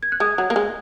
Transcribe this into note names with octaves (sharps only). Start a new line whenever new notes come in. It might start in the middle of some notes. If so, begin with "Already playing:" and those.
G#6
F#6
G#3 D#6 G#6
F#3
A#3
G#3